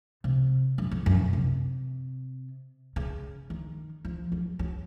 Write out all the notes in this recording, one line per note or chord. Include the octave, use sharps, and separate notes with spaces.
C3
F#2
F2
F#2
A#2
C3
C#3
D#3
F3
F#3
F#3